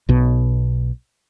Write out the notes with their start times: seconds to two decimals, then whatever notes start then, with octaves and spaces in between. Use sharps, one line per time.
0.09 B1 B2